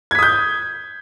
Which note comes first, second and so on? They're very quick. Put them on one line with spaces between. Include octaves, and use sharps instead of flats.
G#6 B6 D#6 G6